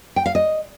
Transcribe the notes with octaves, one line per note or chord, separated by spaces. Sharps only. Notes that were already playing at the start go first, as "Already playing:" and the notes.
G5
F5
D#5